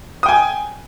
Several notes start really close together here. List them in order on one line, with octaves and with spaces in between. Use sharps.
D#6 G5 G#5